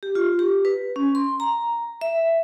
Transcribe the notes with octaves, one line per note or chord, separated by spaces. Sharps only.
G4
F4
G4
B4
C#4
C6
A#5
E5